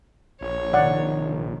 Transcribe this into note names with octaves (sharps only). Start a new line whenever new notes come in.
A#1 C#5
C3 D#3 D5 F#5